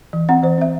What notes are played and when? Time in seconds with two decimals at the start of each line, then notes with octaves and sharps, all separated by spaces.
0.13 E3
0.29 C4 F#5
0.43 E3 C5
0.58 C4 E5